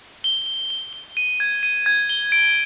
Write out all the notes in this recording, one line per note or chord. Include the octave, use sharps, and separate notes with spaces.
G7
G7
G7
G7
D#7
G#6
D#7
G#6
G7
D7